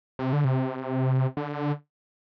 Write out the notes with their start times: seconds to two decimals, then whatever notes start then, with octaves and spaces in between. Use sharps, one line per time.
0.19 C3
0.33 D3
0.45 C3
1.37 D3